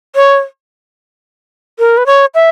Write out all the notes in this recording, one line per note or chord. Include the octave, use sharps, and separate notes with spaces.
C#5
A#4
B4
C#5
E5